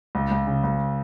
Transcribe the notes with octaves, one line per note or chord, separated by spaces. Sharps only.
C#2
C#2
C#3
C#2